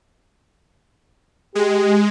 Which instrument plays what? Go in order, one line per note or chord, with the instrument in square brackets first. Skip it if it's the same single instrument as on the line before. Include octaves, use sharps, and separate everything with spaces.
[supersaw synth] G#3 [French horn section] G4